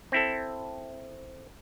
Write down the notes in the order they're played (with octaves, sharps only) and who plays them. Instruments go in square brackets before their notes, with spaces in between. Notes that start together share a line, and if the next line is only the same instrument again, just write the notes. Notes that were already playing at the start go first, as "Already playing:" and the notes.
[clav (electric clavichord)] C4 E4 A4